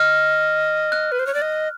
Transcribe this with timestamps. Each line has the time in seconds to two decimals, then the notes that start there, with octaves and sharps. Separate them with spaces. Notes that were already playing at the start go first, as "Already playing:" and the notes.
Already playing: D#5 F6
0.92 F#6
1.12 B4
1.19 C5
1.27 C#5
1.34 D5
1.42 D#5